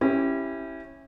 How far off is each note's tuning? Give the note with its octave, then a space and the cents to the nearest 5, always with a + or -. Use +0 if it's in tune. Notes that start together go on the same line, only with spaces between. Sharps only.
C#4 -20 E4 +0 G4 +0